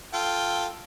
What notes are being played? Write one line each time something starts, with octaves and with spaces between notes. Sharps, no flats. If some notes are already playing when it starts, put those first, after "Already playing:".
F4 A4 G5